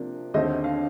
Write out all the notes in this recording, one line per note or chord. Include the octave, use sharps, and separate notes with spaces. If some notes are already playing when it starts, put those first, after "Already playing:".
Already playing: C3 F3 A#3 D4
D#2 D3 A3 C4 D#5
F5